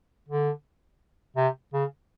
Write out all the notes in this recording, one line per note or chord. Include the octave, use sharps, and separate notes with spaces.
D3
C3
C#3